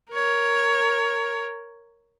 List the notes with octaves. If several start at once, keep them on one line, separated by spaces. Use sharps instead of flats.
A#4 C#5